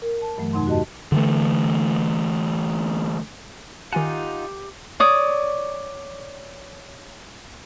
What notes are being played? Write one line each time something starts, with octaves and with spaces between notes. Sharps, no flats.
A#4
A5
G2 E3 F#3 A3
F2 G#2 C3 D#4 F#5 C6
F#4 G4 D#5 A5
D3 E3 A3
D#3 D#4 F4 G4 F#5 G#5
C#5 D5 D#6